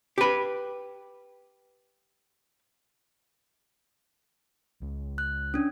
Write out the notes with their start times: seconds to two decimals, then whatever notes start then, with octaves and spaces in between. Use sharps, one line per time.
0.18 G4 B4
4.82 C#2
5.18 F#6
5.54 C#4 D4